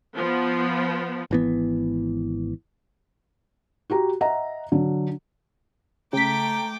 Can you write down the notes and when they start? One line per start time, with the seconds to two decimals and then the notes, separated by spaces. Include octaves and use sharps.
0.16 F3 B3
1.31 G#1 E3 B3
3.90 F#4 G4 A#5
4.21 D#5 E5 F#5 A#5
4.72 D3 F#3
6.13 C#3 A3 G5 A#5 D6 B6